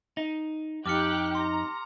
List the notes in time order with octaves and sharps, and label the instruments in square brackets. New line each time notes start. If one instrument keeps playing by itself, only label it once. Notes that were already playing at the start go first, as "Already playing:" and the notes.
[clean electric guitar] D#4
[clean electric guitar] F2 [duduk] D#4 [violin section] G4 F#6 [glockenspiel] D6 F6 C#7
[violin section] A#5 [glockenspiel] C6